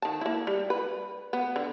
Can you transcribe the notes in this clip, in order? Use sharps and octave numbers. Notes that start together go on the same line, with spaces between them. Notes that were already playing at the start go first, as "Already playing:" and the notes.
D#3 A5
A#3 E4
G3
B4
B3
D3